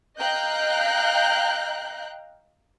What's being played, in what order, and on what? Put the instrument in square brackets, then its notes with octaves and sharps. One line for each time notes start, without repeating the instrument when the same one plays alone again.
[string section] D#5 F5 G5 A#5 F#6 G6